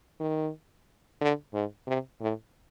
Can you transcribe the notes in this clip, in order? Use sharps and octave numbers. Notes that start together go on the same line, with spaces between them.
D#3
D3
G#2
C3
A2